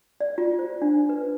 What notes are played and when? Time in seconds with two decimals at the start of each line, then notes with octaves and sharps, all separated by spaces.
0.21 D5
0.38 F4
0.59 C5
0.82 D4
1.09 B4